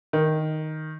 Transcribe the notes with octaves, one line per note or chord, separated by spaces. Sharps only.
D#3